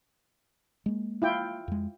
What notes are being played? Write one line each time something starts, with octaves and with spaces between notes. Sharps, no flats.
G#3 A#3
E4 F4 G5
F2 G#3